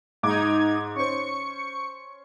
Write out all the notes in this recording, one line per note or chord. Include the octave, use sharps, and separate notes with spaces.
G#2 D#4 D6 G#6
C#4 C5 C#6 C#7